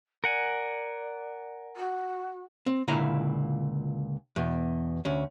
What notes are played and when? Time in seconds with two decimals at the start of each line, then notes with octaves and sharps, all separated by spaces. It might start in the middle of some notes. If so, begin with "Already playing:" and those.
0.24 A#4 D5 F#5 G#5
1.76 F#4
2.66 C4
2.88 C#2 A#2 D3 E4 G#5 A#5
4.36 E2 B2
5.05 D2 C#4